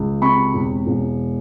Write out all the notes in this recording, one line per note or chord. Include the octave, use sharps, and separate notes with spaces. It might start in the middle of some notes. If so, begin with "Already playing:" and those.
Already playing: C#2
C3 B5 C#6
E1
E1